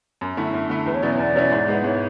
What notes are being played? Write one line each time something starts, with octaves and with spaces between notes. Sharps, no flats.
F#2
D3 A3 E4
F#2
D3 A3 E4
E2 B4
C#5
B2 F#3 C#4 E4 D5
C#5
E2 D5
B2 F#3 C#4 E4
G#2
G#3 B3 E4
G#2 C#5